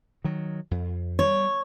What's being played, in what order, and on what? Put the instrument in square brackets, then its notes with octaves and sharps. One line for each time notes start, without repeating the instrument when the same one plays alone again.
[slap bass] D#3 F#3
F2
[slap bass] G3 [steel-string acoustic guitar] C#5